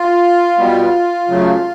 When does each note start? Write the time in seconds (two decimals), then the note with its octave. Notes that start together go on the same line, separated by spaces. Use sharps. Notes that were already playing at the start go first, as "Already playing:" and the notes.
Already playing: F4
0.59 B2 G3 B3
1.27 F#2 C#3 F#3 A3